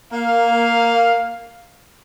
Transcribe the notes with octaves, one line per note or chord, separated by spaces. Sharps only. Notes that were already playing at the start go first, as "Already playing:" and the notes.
A#3 F5